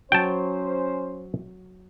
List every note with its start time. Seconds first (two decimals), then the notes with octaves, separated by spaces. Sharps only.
0.12 F#3 C#4 C5 G5 A5